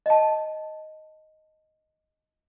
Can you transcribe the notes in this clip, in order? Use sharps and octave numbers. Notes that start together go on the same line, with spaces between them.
D#5 A5